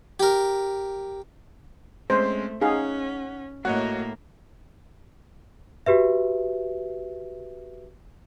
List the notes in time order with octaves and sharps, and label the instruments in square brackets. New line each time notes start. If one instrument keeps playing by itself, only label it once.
[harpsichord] G4 A#4
[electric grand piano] G#3 C4 C#4 [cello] A3 [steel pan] C5
[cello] C#4 [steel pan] D#4 G#4 F5 [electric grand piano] F#5
[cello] A2 A#3 [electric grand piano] F#4 C#5 D#5 [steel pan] F#5
[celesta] F#4 G4 B4 E5